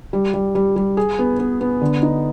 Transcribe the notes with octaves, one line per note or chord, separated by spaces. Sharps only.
G3
G3
G3
G3
G#4
B3
B3
B3
D3
D#4